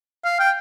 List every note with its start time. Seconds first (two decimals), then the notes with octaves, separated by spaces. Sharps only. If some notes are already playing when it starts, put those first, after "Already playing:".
0.24 F5
0.39 G5